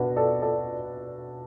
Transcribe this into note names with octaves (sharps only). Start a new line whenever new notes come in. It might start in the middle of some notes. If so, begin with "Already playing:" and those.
Already playing: B2 B3 D4 F#4 B4
A4 D5
A4 D5